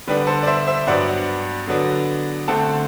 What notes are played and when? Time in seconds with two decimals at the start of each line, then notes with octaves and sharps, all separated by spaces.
0.07 D3 G3 B3 D4 B4
0.27 A4 C5
0.43 D5
0.47 C5 E5
0.67 C5 E5
0.87 G2 F#3 B3 D4 D5 F#5
1.67 D3 F#3 B3 D4
2.48 D3 A3 C4 F#5 A5